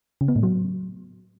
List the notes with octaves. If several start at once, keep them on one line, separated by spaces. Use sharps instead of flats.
C#3
B3
A2
F#3